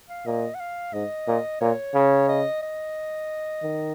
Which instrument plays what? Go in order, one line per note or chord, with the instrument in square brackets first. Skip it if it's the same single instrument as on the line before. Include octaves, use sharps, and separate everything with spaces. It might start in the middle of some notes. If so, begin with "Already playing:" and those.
[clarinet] F5
[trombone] A#2 [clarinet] D#5
[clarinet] F#5
F5
[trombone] G#2 [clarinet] D#5
[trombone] A#2
[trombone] A#2 [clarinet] C#5
[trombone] C#3
[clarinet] D#5
D#5
[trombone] D#3